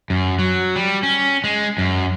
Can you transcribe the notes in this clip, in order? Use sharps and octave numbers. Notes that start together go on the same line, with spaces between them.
F#2
F#3
G3
C#4
G#3
F#2